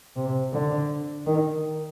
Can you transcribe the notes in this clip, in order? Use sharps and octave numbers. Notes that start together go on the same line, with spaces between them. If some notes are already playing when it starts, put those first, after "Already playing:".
C3
D3
D#3